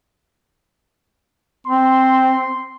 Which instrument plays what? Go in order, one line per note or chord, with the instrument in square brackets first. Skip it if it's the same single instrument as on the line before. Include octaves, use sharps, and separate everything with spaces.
[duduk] C4 [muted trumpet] C6